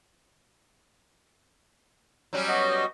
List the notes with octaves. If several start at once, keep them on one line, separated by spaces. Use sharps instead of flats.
F#3 G3 C#4
B3 F#4 D#5